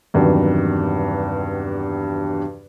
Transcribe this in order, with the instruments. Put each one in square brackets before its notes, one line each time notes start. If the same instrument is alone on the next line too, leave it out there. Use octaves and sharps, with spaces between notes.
[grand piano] E2 G2 C3 D#3 F#3